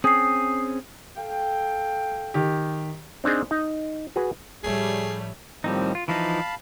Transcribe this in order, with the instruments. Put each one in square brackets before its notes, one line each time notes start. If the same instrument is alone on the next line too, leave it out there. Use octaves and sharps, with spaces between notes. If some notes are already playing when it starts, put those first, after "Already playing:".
[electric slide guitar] C4 C#4 G#4 [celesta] D#6 C7
[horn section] A4 F5 G5
[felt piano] D#3 G4
[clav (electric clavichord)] C4 D4 D#4 G#4
D#4
F#4 G#4 B4
[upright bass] A2 F3 [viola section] G3 [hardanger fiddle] A3 C#5 [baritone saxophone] G#4
[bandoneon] A2 D#3 F3 [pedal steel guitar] G3 C4 D#4
[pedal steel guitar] F4
[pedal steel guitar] E3 F3 D#4 [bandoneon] F5 A5 B5